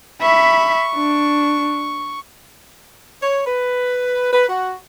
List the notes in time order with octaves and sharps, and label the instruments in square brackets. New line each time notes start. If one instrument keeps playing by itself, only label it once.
[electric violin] E5 B5 [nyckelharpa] C#6
[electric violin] D4
[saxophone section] C#5
B4
B4
F#4